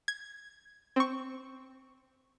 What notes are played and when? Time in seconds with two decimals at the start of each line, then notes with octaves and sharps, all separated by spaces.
0.08 G#6
0.96 C4 C#6